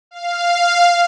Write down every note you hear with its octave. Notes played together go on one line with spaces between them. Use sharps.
F5